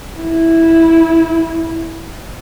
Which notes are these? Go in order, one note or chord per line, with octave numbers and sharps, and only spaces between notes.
E4